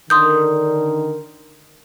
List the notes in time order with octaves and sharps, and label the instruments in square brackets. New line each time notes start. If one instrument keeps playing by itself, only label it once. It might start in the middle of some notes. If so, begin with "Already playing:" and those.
[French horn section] D3 D#3 A#4 [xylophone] C6 D#6 G6